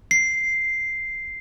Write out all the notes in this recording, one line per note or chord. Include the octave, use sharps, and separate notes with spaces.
C7